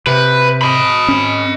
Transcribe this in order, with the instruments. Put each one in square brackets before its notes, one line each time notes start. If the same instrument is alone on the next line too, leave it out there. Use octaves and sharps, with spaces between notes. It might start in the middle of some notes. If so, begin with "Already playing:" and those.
[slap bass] C3 [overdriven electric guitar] B4
[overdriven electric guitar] D#5 B5
[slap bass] C#4